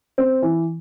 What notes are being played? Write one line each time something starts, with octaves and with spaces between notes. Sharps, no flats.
C4
E3